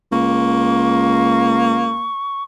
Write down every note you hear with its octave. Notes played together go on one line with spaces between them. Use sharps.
C#2 A#3 C#6